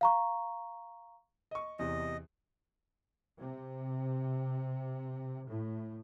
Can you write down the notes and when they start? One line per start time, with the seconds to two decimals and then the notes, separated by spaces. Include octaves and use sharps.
0.01 F5 A#5 C#6
1.51 D#5 C#6
1.79 E2 C3 D#5
3.37 C3
5.48 A2